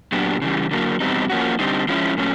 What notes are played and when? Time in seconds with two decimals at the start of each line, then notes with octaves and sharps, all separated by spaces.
0.12 A#2 F#3 B3 D4 G4
0.42 C#3 E3 G3
0.71 D3 F#3 A#3
1.00 E2 B2 G3 C4 D#4
1.30 F3 A#3 C#4 F#4
1.59 D3 G3 C4 D#4
1.89 F3 G#3 C#4 E4
2.18 A#2 F#3 A3 C#4